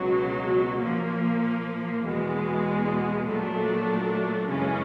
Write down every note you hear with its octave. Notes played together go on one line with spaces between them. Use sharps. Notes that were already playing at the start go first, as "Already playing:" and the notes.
Already playing: C#2 B2 F#3
A#2 F3 A#3
E2 B2 G#3
A#2 F#3 A3 D4
F#2 C#3 E3 G#3 C#4